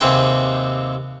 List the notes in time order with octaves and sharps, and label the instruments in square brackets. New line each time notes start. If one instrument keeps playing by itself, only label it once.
[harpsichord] D#2 C3 C4 G#4 B4 G5